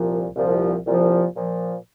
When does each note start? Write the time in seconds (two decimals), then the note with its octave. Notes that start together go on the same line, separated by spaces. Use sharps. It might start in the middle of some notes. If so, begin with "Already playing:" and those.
Already playing: C2 A#2 F3
0.35 C2 A#2 F3
0.86 C2 A#2 F3
1.36 A#2 F3